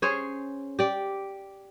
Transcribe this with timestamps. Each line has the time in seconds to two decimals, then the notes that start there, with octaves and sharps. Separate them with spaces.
0.02 C#4 G#4 C5 C#5
0.79 G4 D5